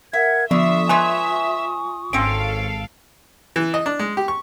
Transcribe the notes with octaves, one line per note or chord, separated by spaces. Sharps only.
A#4 E5 F#5 G#6
D3 F3 F4 E5 C#6 D#6
G#3 B4 C#5 G#5
G#1 C4 C#4 A4 F5 D7
E3
D#5
D4
G#3
G4
C#6